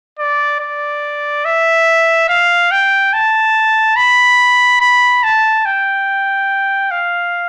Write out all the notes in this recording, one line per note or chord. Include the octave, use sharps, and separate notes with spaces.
D5
D5
E5
F5
G5
A5
B5
B5
A5
G5
F5